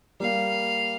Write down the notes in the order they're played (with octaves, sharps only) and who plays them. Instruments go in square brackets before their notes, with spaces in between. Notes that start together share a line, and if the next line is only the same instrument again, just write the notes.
[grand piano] G3 A#3 [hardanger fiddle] F5